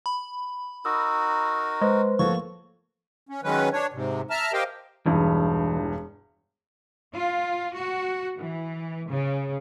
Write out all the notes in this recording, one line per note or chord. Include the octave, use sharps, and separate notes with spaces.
B5
D#4 F#4 A#4 D#6 E6
G#3 B4 C5
F3 A3 A#3 F#4 A4 C#5 C#6
C#4
D#3 F#3 G#3 C#4 B4
D4 C#5
G#2 C3
E5 A5 A#5 F6
G4 A#4 C5 D#5 F5 G5
E1 G2 E3 D#4
F4
F#4
E3
C#3